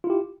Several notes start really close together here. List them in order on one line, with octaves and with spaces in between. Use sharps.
F4 E4 G4